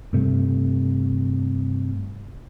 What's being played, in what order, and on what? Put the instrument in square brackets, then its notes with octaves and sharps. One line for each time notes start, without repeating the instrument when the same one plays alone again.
[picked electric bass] G2 C3 A3